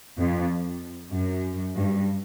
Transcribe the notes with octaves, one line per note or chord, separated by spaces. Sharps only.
F2
F#2
G2